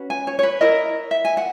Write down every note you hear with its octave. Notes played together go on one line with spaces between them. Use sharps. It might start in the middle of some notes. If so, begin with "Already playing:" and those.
Already playing: C#4 F#4 B4
G#5
C#5
C#5
B4
E4 A#4 D#5
E5
G#5
F#5